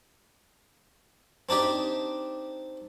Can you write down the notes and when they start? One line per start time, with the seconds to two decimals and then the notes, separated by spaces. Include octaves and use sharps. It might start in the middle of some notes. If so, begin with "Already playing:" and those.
1.49 C4 D4 D#4 G4